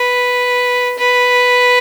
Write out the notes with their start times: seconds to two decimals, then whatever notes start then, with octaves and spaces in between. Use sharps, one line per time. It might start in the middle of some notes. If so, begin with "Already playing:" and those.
Already playing: B4
0.98 B4